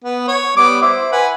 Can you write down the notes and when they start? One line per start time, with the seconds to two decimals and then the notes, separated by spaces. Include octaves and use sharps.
0.04 B3
0.28 C#5
0.57 G3 B3 D6
0.82 E4 C5
1.12 B4 F#5 G#5